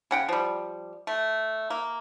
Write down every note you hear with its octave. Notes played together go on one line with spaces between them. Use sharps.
C#3 F#5 G5
F3 G3
A3
A#3